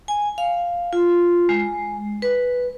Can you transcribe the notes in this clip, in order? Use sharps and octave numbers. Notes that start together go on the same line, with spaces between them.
G#5
F5
F4
G#3
B4